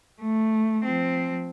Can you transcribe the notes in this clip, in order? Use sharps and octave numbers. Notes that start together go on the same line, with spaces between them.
A3
F3 C4